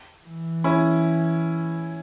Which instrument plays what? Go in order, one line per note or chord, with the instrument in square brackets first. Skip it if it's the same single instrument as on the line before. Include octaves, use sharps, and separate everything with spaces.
[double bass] E3
[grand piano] C#4 E4